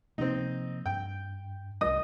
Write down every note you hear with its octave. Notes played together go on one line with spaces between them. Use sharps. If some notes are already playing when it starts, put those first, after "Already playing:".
C3 F3 A#3 C4 D#4
G2 G5
C2 G3 D#5 D#6